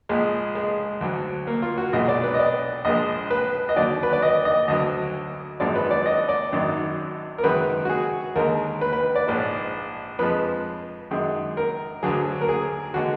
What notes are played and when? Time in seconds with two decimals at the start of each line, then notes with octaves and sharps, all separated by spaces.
0.09 A#1 A#2 G#3
0.55 G#3
1.01 D2 D3 F#3
1.47 A#3
1.62 F4
1.78 F#4
1.93 B1 A#2 G#3 D#5
2.08 D5
2.24 B4
2.34 D#5
2.39 D5
2.85 A#1 A#2 F3 G#3 D#5
3.31 B4
3.69 D#5
3.76 D#2 D3 F#3 D5
4.03 B4
4.13 D5
4.22 D#5
4.45 D#5
4.68 D2 D3 F#3 D#5
5.60 G#1 F#2 F3 G#3 D5
5.76 B4
5.91 D5
6.06 D#5
6.29 D5
6.52 G#1 F#2 D#3 F#3
7.38 A#4
7.44 F#2 D#3 G#3 B4
7.85 F#4
7.89 G#4
8.36 D#2 D3 G#3 A#4
8.81 B4
8.93 B4
9.16 D5
9.27 A#1 G#2 F3 G#3
10.19 F2 F3 G#3 B4
11.11 F#2 D#3 G#3
11.57 A#4
12.03 D2 D3 F#3 G#4
12.41 A#4
12.49 G#4
12.94 D3 G#3 F#4